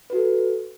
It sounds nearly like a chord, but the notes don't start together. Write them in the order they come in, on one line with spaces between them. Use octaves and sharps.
B4 F#4 A4